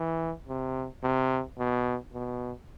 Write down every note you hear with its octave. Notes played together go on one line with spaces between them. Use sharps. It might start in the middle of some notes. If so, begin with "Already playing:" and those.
Already playing: E3
C3
C3
B2
B2